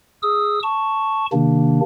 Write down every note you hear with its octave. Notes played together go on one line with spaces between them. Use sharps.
G#4 D#6 E6
A5 C#6
C3 D#3 A#3 D4